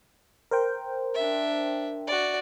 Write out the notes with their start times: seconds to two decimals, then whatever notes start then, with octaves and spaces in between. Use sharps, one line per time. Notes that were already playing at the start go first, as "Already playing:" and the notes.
0.51 A#4 C5 G5
1.14 D4 E5
2.07 F#4 D5